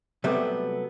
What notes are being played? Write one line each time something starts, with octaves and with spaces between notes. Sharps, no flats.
C3 F#3 G3 A3 B3 C4